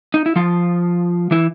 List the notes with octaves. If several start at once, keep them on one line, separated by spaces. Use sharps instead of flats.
D#4
E4
F3 F4
E3 E4